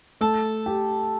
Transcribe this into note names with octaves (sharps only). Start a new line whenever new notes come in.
A3 A4
G4